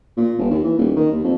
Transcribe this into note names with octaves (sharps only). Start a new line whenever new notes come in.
A#2
G1
D#2
E3
D#1
D#3
D#2
F2